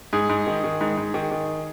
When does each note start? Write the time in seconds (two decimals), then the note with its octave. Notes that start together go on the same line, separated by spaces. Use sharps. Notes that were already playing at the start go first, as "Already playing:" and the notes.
0.13 G#2 G#4
0.29 G#2
0.47 D#3
0.64 D#3
0.81 G#2
0.97 G#2
1.14 D#3
1.31 D#3